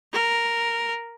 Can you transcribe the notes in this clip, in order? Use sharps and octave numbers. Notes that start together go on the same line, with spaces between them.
A#4